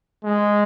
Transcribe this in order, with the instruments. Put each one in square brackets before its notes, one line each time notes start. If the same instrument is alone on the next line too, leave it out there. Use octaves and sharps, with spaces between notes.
[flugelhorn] G#3